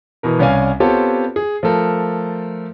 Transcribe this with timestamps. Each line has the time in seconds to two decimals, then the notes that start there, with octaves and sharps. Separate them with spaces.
0.23 B2 E3 A#4
0.39 C2 C#4 D5 F5 G#5
0.80 B3 C4 F4 G4 A4 C#5
1.36 G#4
1.63 F3 A3 A4 A#4